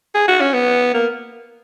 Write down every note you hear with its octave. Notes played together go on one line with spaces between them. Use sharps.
G#4
F#4
C#4
B3
A#3